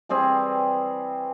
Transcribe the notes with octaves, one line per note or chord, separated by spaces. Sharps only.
E3 G3 C4 G#4